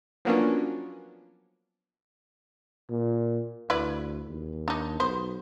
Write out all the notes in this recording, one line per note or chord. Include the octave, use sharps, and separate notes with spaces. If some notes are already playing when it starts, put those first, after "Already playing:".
F3 F#3 A#3 B3 C#4 D4
A#2
D2 E4 B4 D5
D#2
D4 D#4
B1 B3 C5